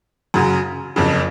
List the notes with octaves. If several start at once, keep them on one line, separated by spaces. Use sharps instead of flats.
F#2 C#3 F#3
F#1 F2 C#3